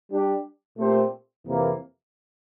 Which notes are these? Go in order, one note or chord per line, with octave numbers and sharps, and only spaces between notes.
G3 D4 G4
A#2 A3 C4 G4 C5
F2 C3 E3 A#3